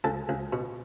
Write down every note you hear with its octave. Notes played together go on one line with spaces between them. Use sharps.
C#2 A4
C#2
B2